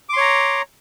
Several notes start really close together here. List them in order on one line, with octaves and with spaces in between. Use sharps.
D6 C6 C#5 A#5